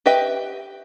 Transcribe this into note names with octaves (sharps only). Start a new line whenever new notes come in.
G4 B4 D#5 E5 G5